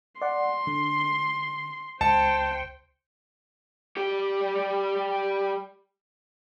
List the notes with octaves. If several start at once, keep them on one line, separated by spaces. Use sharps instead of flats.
D5 F#5 C6
D3
C#2 C5 G5 A5 C#7
G3 G4